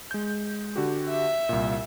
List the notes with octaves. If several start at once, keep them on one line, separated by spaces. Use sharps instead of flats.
G#3 G6
D3 F#4 G4
E5
C2 A#2